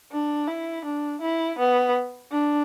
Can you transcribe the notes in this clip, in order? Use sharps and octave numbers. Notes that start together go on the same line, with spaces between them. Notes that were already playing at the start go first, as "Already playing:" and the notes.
D4
E4
D4
E4
B3
D4